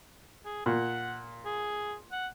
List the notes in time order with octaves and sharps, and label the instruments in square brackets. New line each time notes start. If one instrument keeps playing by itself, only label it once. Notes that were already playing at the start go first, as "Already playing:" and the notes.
[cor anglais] G#4
[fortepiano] A#2 [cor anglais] F#5
[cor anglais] G#4
F#5